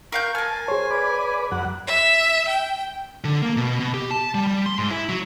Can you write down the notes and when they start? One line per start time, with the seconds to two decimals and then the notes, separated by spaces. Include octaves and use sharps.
0.12 A#4 F5 C#6 G6
0.35 A#4 G#5 A5 F6
0.68 G#4 C5 C#5
0.91 B4 D5
1.52 F#2 F#5
1.87 E5
2.48 G5
3.24 D3
3.43 A#3
3.57 B2
3.80 B2
3.94 G4
4.11 A5
4.34 G3
4.47 G3
4.66 C6
4.79 G#2
4.91 E4
5.09 F#3